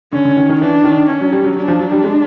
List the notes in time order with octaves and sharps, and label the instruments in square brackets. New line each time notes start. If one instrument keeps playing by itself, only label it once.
[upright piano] D3 [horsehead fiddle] C#4
[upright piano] D3
D#3
D#3
[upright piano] E3 [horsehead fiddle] D4
[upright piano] D#3
[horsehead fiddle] C#4
[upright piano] F#3
G3
F#3
[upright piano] F#3 [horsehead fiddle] D4
[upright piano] F3
F#3
G3
G#3